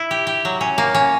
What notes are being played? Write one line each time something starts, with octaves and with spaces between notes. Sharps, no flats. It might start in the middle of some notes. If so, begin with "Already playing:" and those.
Already playing: E4
G4
G4
F#3
C#4
A#3
C#4